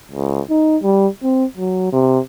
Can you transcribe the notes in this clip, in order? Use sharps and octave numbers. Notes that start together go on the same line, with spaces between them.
C#2
D#4
G3
C4
F#3
C3